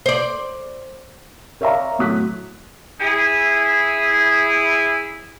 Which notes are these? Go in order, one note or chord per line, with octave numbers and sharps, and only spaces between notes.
C5 D5
A#4 C#5 D5 E5 F5 A#5
A2 F#3 D#6 F#6 B6
E4 G#4